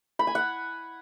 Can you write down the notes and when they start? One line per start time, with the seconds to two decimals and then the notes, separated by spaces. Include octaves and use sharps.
0.19 B5
0.27 G#5
0.35 F#5